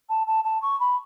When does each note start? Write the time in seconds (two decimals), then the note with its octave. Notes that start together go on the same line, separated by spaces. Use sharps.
0.09 A5
0.27 A5
0.44 A5
0.62 C#6
0.80 B5